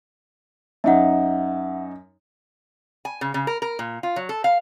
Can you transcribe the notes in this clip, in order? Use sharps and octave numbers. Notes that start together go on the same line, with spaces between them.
F#2 D#4 E5 F#5
G#5
C#3
C#3
A#4
A#4
A#2
F4
F#3
A4
F5